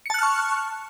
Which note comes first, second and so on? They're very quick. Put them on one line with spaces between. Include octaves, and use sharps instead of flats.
C#7 A5 F#6 F6 C#6